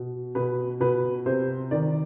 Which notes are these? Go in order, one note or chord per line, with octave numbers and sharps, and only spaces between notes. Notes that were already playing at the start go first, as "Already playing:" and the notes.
Already playing: B2
B2 B4
B2 B4
C3 C5
D#3 D5